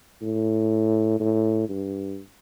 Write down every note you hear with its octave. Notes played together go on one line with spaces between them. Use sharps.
A2
A2
G2